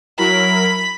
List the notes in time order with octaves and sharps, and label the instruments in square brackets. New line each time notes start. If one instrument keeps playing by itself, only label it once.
[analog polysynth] F#3 E4 A#4 [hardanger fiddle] B5